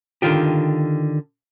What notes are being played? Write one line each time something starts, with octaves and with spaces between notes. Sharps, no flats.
D3 D#3 F4 G4